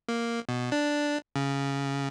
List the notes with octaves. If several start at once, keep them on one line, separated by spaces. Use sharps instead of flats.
A#3
B2
D4
C#3